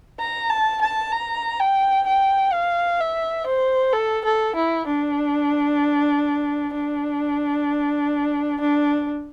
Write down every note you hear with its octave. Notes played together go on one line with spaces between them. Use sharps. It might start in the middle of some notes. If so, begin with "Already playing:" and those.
A#5
A5
A5
A#5
G5
G5
F5
E5
C5
A4
A4
E4
D4
D4
D4